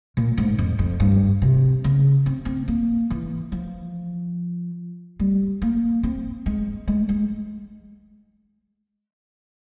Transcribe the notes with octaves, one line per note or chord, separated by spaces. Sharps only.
A#2
G#2
F2
F2
G2
C3
C#3
C4
C4
A#3
E3
F3
G3
A#3
C4
G#3
G#3
G#3